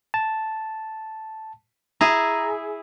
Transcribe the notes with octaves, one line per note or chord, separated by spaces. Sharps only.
A5
E4 G#4 A#5